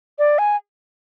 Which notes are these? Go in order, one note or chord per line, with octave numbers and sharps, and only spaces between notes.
D5
G#5